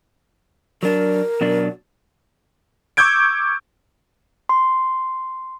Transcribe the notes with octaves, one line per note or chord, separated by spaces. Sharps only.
F#3 D4 A#4
B2 F#3 D4
C#6 D6 E6 G6 G#6 D7
C6